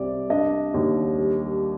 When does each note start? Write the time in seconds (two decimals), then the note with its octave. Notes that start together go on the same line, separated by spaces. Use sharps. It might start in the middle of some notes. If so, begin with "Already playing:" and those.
Already playing: C2 C4 D5
0.30 D4 D#5
0.74 D#2
1.18 G3